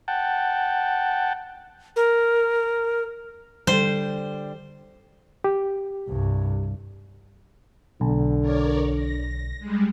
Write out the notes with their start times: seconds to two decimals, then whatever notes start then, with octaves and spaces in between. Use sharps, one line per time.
0.08 F#5 G5 A5
1.96 A#4
3.67 D3 G3 C5
5.44 G4
6.08 C2 G2
8.01 B1 D3
8.41 A#4 C#5 D5
8.93 A#6
9.60 G3 G#3